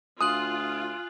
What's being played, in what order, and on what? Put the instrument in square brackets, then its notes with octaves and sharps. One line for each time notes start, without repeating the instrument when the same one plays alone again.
[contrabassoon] D2 [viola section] F4 [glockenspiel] G#5 F#6 F#7 [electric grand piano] D#6